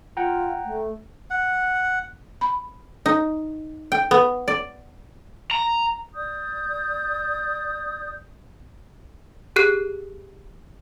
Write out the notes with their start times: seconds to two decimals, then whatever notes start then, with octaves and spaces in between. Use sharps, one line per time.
0.17 F4 F#5 G5 A#5
0.65 A3
1.30 F#5
2.41 B5
3.06 D#4
3.92 G5
4.11 B3
4.48 D5
5.51 A#5
6.14 D5 D#6 G6
9.56 G4 G#4 F#6 C7